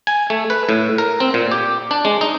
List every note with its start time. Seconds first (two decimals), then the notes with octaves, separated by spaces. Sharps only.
0.07 G#5
0.30 A3
0.50 B4
0.69 A2
0.98 A#4
1.20 C4
1.34 A#2
1.52 G4
1.91 D4
2.05 G#3
2.21 D#4